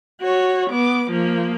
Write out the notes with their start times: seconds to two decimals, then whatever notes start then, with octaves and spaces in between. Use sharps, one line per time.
0.21 F#4 C#5
0.71 B3 D6
1.11 F3 A#3